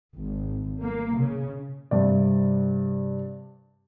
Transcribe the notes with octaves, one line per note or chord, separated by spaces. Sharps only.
G#1
A#3
C#3
G2 C3 D5